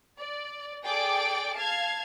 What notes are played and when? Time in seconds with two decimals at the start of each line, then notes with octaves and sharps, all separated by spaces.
0.18 D5
0.85 G#4 A4 D5 G5 D6 D7
1.56 F5 A5 G#6